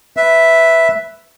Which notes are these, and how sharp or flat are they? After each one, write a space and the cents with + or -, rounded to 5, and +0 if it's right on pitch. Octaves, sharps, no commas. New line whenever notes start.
B4 +0 E5 +0